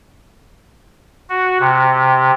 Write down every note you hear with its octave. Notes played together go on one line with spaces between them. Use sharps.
F#4
C3